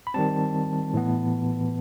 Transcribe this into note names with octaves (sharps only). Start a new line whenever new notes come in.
B5
D#3 G3 C4 A5
A2 E3 B3